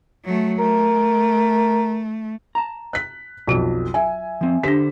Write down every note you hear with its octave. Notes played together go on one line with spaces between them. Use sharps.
F#3 A3
A3 A#4
A5 A#5
F#6 B6
B1 F2 F#3 F4
E5 G#5
F3 C4
D3 D4 G4 C5 B6